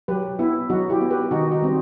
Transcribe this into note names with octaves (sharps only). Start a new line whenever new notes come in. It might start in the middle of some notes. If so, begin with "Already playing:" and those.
F#3 G4 B4
B3 E4
F#3 D#4 F#4
E4 G4
B3
G4 B4
D#3 D#4 F#4
D#4 F#4
G3 C4